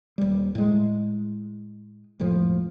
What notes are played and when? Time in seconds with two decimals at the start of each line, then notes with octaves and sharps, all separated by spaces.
0.18 D#1 G3
0.55 A2 G#3
2.19 E1 F2 A2 F3